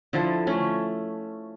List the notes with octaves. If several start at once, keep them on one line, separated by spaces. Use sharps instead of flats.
D3 F3 E4 A4
A3 C#4